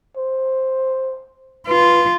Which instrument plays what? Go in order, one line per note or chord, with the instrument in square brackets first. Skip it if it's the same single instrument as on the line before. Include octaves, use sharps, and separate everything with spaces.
[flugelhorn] C5
[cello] F4 [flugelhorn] B4